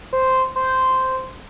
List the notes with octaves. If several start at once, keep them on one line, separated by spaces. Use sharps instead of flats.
C5
C5